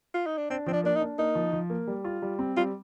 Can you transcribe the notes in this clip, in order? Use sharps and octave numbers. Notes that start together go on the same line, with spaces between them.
F4
D#4
D4
C4 D4
F3 C4
D4
A#3 D4
D#4
D4
A#3 D#4
F3
F3
A#3
G3
F4
G3
C4
G3 F4